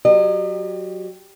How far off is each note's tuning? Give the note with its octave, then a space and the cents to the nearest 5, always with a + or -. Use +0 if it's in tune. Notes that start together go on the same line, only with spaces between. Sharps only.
F#3 +0 G4 +0 D#5 -45